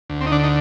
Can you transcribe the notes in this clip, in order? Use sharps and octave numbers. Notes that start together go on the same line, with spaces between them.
D2
C4
D#4
D3 D4
D#4